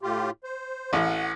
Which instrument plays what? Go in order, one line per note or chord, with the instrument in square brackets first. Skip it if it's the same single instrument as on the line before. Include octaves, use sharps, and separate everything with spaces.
[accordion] A2 F4 G4
C5
[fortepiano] A1 [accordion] F#5